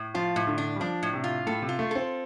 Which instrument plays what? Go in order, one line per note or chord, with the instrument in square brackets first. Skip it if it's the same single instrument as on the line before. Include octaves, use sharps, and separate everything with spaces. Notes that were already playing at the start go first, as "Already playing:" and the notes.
Already playing: [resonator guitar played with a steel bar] A2
[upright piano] F3 [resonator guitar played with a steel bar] F4
[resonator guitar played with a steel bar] A2
[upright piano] D3
[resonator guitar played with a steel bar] D4
[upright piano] G3
[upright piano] F3 [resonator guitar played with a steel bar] D4
[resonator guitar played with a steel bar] A2
[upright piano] C3
[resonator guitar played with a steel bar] F4
[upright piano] A2 [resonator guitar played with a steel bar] A4
[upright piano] C3
[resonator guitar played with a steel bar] F4
[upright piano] A3
[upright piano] C4 [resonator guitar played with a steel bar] A4